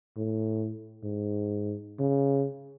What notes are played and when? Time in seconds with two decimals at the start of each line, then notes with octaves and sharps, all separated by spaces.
0.17 A2
1.03 G#2
1.99 C#3